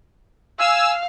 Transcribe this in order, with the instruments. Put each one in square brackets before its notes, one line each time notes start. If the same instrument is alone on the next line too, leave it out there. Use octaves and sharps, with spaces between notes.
[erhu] F5 [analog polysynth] G#5 E6